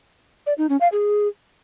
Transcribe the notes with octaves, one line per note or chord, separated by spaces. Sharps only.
D5
D#4
C#4
F5
G#4